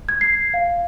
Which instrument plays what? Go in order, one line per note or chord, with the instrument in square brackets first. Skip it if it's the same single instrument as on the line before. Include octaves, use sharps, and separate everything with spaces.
[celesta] G#6
C7
F5